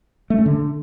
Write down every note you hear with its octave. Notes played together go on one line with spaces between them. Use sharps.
A3
C#4
D3